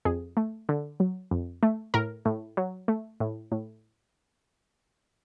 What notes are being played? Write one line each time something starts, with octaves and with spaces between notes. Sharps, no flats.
F2 G#4
A3
D3
F#3
F2
A3
A2 A#4
A2
F#3
A3
A2
A2